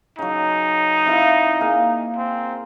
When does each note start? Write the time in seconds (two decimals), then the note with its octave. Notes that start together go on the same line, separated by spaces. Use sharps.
0.19 C#3 F#3 D#4
1.06 C3 E4 F5
1.61 A#3 G#4 F5
2.16 C4